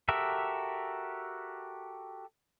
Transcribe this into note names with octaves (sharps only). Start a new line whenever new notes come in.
F#4 G4 A4 A#4 E5